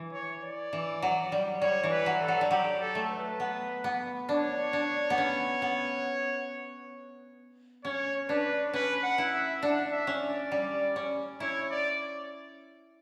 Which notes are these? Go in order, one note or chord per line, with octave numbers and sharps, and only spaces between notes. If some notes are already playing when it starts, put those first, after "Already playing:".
Already playing: E3
C#5
D5
E3
F#3
G3
G3 C#5
E3
B4
F#3
A4
F#3
G3
F#3 G4
A4
A3
B4
B3
B3
D4 C#5
D4
B3
C#4
B3
C#4 C#5
D4 B4
C#4 B4
F#5
E4
E5
D4 F#5
E5
C#4
D5
G3
C#4
E4 C#5
D5